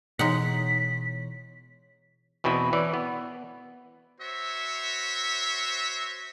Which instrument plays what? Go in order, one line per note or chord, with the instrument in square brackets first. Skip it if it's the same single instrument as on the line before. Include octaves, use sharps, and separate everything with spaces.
[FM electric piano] B2 E3 C#5 [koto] G#3 D#4 F#5 [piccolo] B6
[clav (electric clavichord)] E2 B2 C4 E4 B4
E3 C#5 D5
B3
[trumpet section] F#4 C5 C#5 E5